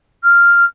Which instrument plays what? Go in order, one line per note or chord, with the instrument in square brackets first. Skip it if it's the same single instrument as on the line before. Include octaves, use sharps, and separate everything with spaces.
[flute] F6